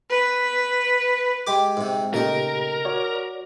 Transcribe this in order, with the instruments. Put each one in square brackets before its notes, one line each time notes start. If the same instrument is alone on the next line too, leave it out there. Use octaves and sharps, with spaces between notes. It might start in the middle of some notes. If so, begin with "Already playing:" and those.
[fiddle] B4
[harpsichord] G#3 G4 D6
G#2 C3
[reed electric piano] A#2 C#3 G4 [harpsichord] A3 D#4 [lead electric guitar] A#4
[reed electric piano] F#4 C#5 D5